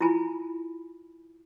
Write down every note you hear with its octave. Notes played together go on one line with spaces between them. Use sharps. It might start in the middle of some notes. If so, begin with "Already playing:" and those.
E4 F4 G#5 B5